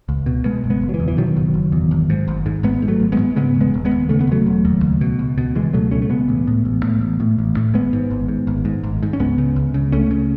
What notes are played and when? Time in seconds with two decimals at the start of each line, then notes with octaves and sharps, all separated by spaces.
0.09 C#2
0.26 B2
0.45 B2 G#3 B3
0.64 F#1
0.70 G#3 B3
0.82 F#1
0.89 F#3
0.94 E3
1.00 E2
1.08 E3
1.18 B2 D#3 F#3
1.36 F#1
1.54 F#1
1.72 E2
1.91 G#1
2.10 G#2
2.28 G#1
2.46 G#2
2.63 G#1 G#3 B3
2.82 G#2
2.88 F#3 A3
3.00 G#1
3.12 G#3 B3
3.18 G#2
3.36 C#3 G#3 B3
3.55 E1
3.60 G#3 B3
3.74 E1
3.85 G#3 B3
3.91 D#2
4.09 C#3 A3
4.21 B3
4.27 E1 F#3 A3
4.46 E1
4.65 D#2
4.83 C#2
5.01 B2
5.19 C#2
5.38 B2
5.55 C#2 E3 G#3
5.73 B2 F#3 A3
5.91 C#2 A3 C#4
6.02 A3
6.10 B2 G#3 B3
6.28 A1
6.47 A2
6.65 A1
6.83 A2
7.01 A1
7.20 A2
7.38 A1
7.57 A2
7.74 G#1 G#3 B3
7.93 G#2
8.11 G#1
8.28 G#2
8.47 G#1
8.65 G#2
8.83 G#1
9.03 G#2
9.13 C#4
9.20 C#2 G#3 B3
9.38 C#3
9.56 C#2
9.74 C#3
9.92 C#2 A3 C#4
10.11 C#3